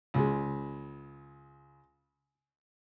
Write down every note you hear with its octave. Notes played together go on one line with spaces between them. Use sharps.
C#2 G#3